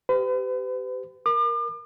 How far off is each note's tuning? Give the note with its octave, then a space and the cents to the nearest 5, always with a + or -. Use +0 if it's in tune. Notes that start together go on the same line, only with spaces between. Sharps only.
G4 -10 B4 +45
A#4 +5 D6 +40